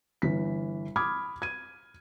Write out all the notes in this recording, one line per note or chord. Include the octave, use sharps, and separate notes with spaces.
G1 E3 B6
B5 D6 D#6 F6 G#6
G#6 D#7